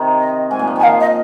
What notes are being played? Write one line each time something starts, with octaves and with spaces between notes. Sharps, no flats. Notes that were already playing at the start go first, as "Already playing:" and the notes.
Already playing: C3 D#3
D#5
G#2 G#5
A#2
F3
D#3 G#5
F3 F5
D#5